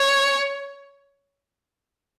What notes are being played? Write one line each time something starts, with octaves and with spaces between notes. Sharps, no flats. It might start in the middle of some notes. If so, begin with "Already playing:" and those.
Already playing: C#5